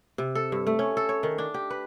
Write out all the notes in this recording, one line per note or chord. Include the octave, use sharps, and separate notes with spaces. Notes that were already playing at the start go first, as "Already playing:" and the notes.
C3
A4
G2
A3
C#4
A4
C#5
D#3
D4
G4
B4